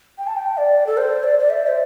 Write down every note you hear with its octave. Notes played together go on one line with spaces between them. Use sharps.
G5
A5
G5
D5
A4
C5
D5
D5
E5
C5